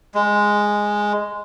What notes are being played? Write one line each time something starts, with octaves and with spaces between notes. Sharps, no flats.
G#3